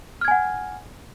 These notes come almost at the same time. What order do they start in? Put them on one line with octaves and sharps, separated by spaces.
F6 G#6 G#5 F#5